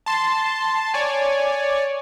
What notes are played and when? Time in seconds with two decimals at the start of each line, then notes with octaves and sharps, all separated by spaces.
0.06 A5 C6
0.94 C#5 D5 G#5